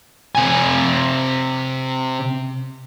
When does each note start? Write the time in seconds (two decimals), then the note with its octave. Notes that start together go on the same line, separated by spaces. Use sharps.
0.35 C3 G#5